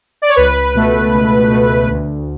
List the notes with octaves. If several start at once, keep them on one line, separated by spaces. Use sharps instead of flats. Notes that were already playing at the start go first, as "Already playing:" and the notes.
D5
C#5
C#2 B4
B2 A3
C#2
B2 A3
D2